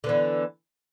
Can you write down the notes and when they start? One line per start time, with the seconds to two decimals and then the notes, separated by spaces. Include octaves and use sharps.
0.04 D3
0.06 B3
0.09 E3